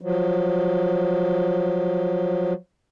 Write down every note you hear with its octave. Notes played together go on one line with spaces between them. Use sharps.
F3 F#3